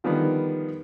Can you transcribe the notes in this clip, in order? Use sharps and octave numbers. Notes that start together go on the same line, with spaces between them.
D3 D#3 F3 G3 B3